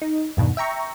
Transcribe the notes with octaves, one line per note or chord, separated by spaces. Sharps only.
D#4
E2 G2 B2 D#3
E5 G5 A#5 C#6